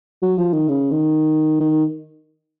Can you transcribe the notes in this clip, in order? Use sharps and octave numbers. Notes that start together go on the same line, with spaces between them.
F#3
F3
D#3
C#3
D#3
D#3